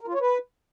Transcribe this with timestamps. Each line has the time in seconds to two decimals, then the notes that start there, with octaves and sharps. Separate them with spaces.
0.01 A#4
0.08 F4
0.14 C#5
0.21 B4